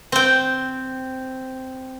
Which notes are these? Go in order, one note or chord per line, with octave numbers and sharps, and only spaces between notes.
C4 G5